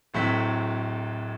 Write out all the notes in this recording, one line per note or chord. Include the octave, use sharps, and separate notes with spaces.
D1 A2 F#3 C4 B6